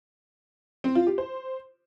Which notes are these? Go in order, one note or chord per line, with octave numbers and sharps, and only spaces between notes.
C4
F4
G4
C5